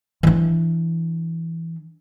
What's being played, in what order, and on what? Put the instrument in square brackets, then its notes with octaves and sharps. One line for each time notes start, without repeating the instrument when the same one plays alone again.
[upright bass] E3 D4